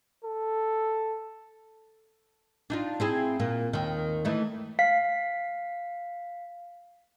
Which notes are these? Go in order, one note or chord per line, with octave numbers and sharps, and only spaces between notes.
A4
D4 D#4 F4
C4 E4 G#4
A#2 A#3
D#2 D#3
E3 A3 D#4
F5 B6